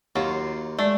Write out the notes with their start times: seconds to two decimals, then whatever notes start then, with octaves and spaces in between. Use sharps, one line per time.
0.16 D#2 F#3 F4
0.79 G#3 A3 D5